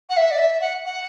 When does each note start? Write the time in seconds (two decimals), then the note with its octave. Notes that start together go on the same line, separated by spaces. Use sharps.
0.09 F#5
0.17 E5
0.31 D5
0.38 E5
0.61 F#5
0.85 F#5